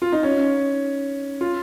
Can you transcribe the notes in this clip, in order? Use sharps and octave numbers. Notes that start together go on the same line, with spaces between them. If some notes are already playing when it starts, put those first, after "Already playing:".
F4
D#4
C#4
F4